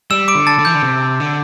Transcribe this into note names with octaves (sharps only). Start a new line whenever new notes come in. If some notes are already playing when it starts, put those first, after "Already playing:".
G3 E6 E7
D6 D7
D3
A5 A6
D3
E3 G6
D3
C3
D3